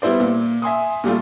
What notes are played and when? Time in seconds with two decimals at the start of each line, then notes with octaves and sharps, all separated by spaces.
0.02 G3 B3 E4 C5 D5
0.20 A#2
0.62 E5 G#5 C6 D#6
1.04 A#2 G3 A3 F4